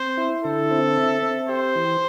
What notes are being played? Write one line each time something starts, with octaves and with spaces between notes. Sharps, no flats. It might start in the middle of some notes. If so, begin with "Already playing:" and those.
Already playing: C4 C5
E4
D3 A4
C4
E5
C4
G4 C5
E3